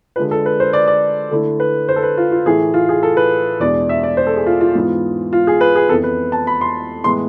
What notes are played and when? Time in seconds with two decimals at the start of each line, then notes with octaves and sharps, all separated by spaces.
0.16 D3 G#3 D4 F4 B4
0.31 A4
0.46 B4
0.60 C5
0.73 D5
0.87 D5
1.31 D3 A3 E4
1.60 B4
1.89 C5
1.96 A4
2.03 B4
2.17 F4
2.32 F4
2.46 A2 E3 A3 E4 G#4
2.74 F4
2.89 G#4
3.03 A4
3.17 B4
3.60 E2 B2 G#3 D4 D5
3.89 E5
4.03 D5
4.17 C5
4.27 A4
4.37 G#4
4.46 F4
4.61 F4
4.75 G#2 E3 B3 F4
5.33 F4
5.47 G#4
5.61 B4
5.76 G#4
5.89 F2 E3 B3 E4 A4
6.03 B4
6.32 A5
6.47 B5
6.61 C6
7.04 A2 E3 G#3 B3 C6